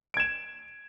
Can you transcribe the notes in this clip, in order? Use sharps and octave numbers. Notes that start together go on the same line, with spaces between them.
G#6 D7 E7